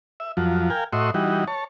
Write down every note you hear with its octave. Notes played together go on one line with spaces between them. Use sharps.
E5
F2 F3 F#3
A#4 F5 G5 G#5
A2 F#4 D#5 E5 C6 C#6
E3 G3 D#4 F#4
C#5 A5